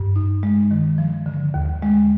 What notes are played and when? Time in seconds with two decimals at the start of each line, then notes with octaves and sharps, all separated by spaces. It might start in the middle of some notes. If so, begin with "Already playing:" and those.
Already playing: G2
0.16 D#4
0.43 G#3
0.71 D#3
0.98 F3
1.26 D3
1.54 D#2
1.82 G#3